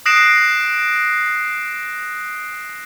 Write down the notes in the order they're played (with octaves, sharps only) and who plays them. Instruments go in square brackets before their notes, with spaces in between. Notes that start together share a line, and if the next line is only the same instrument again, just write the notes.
[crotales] D#6 F#6 A#6 C7 D7 E7